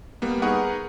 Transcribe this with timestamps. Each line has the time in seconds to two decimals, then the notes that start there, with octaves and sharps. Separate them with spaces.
0.22 G3 A#3 B3
0.42 D#4 G#4 A#4 B4 F#5 C#6